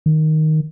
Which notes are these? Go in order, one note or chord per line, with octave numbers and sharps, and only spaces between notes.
D#3